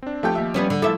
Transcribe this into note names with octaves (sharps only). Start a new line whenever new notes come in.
C4 D4
F3 A3 G4 A4 G5
D#2 E5
G3 B3 C#4
D3
F3 A3 E4 A4 E5 D6 E6